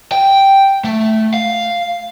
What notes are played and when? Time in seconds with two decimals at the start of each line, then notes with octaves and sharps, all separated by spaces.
0.12 G5
0.85 A3
1.34 F5